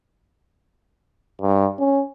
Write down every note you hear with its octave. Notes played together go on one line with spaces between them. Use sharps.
G2
C#4